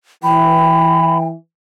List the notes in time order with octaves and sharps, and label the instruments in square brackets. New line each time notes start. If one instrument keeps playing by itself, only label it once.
[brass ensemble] E3 [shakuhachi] G5 [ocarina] B5